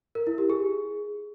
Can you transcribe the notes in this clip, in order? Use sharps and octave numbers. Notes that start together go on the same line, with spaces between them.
A#4
E4
G4
G#4